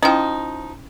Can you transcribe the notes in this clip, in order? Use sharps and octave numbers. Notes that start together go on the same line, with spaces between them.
F3 C#4 D#4 E4 G5